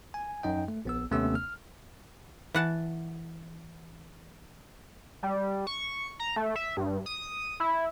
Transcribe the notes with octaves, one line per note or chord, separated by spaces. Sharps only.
G#5
F#2 D#4 D#5 G5
A3
A#1 B3 E6
D#2 C3 A3 B3 C#4 E6
F6
E3 F#5 A5
G3
C#6
A#5
A3
E5
G2
D#6
E4